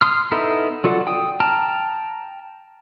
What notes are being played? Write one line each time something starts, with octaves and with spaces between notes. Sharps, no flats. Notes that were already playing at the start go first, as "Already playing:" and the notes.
C6 D#6 F6
B3 D#4 E4 A4
F#3 F4 A4 D5 F#5
G5 D#6
G5 A5 A#5 F6